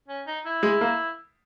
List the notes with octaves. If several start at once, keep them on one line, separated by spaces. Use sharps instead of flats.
C#4
D#4
E4
G#3
A#3